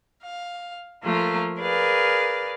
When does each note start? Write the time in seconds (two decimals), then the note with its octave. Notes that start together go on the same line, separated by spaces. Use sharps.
0.24 F5
1.04 F3 A3 A#3 F4
1.59 G#4 A#4 B4 D5 F5